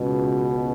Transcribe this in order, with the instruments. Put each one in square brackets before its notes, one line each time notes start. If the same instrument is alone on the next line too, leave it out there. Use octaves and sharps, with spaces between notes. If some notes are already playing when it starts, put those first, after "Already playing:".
Already playing: [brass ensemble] C#2 B2